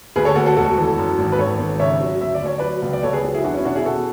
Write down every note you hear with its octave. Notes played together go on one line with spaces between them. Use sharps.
D2 G#4 B4
A4 C#5
D2 F#4 A4
F#4 A4
E1 F#4 A4
E3
F#2
G#1
B4
G#1 A4 C#5
G#1
C#3 C#5 E5
F#3
D2 E5
D5
D2 C#5
F#3 B4 D5
C#2
D5
C#2 A4 C#5
G#4 B4
F#3
E4 G#4
E2 D4 F#4
C#4 E4
B2 D4 F#4
E4 G#4
B2 F#4 A4